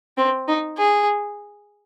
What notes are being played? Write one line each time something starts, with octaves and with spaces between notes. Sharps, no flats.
C4
D#4
G#4